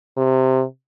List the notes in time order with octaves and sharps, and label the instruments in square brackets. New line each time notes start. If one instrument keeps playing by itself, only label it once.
[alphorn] C3